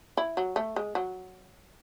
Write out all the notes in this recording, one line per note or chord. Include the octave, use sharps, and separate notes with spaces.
E4
F#3
A3
G#3
F#3